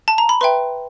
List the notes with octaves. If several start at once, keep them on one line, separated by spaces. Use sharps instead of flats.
A5
A#5
B5
B4 E5 G5 C6